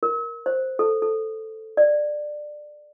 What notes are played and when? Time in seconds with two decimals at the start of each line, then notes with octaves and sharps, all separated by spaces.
0.03 A#4
0.46 C5
0.79 A4
1.02 A4
1.77 D5